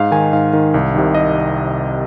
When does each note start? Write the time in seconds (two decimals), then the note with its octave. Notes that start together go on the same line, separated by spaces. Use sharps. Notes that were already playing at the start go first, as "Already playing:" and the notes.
Already playing: G#2 F5
0.11 D#3 G#5
0.33 G#2 F5
0.53 D#3
0.74 C2
0.95 C3 D#3
1.15 D#5